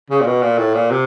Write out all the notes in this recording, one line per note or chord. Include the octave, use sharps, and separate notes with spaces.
C#3
A#2
B2
A#2
A2
A#2
C3